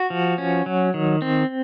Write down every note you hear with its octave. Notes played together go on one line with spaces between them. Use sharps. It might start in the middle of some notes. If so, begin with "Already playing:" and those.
Already playing: F#4
F3
C#4
F#3
D#3
C4